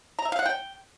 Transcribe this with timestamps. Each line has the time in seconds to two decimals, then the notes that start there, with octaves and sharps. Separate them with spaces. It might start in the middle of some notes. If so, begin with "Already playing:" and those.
0.19 A#5
0.25 E5
0.32 F5
0.39 F#5
0.46 G5